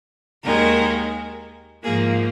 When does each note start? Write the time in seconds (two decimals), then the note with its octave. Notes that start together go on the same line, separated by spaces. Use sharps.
0.42 D#2 D#3 G#3 A#4
1.83 G#2 F3 A#3 G#4